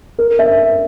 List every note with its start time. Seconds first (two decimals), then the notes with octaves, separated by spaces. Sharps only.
0.18 A#4
0.39 E5